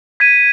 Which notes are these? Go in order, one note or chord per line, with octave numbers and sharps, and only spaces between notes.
G#6 B6 D#7